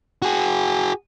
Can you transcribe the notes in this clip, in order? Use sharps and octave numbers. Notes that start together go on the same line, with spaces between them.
F#4 G#4